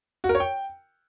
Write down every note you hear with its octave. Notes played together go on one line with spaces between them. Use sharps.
F#4
A#4
C#5
G5